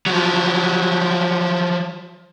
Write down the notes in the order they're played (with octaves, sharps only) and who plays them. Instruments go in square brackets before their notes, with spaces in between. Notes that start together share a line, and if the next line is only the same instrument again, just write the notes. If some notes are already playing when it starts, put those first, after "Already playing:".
[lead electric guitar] F3 F#3